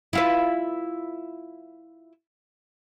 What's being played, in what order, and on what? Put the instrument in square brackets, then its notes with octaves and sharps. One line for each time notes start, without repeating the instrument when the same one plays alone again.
[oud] E4 F4 B4